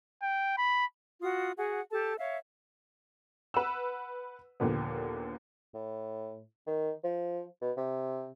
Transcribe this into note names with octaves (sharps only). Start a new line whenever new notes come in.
G5
B5
F4 F#4 D#6
F#4 G#4 F#5
G4 A4 A5
C#5 E5 F5
B4 F#5 E6
D#2 A#2 D3 F3 B3
A2
D#3
F3
B2
C3